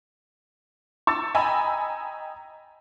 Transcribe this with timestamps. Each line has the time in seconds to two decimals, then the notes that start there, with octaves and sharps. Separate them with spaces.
1.07 C#6 E6 A6
1.35 D#5 G5 G#5 A#5 B5 E6